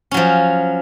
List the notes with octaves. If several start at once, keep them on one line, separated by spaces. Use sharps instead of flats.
F3 F#3 C#4